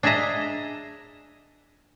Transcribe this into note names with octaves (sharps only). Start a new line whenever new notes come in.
D4 G#4 D#5 E5 A#5